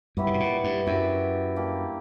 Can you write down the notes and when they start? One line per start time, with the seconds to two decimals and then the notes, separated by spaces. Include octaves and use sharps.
0.17 G2 F#3 B3 E4 G4
0.27 C#3
0.34 B2
0.40 A#2
0.64 G2
0.86 F#2 F#3 B3 E4 G4
1.56 G3 A#3 D4 G4